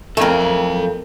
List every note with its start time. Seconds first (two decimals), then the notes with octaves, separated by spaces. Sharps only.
0.17 F2 A3 A4 A#4 F5 G#5